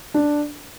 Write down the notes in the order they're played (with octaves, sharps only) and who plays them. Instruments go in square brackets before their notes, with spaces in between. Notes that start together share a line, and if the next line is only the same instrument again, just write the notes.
[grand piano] D4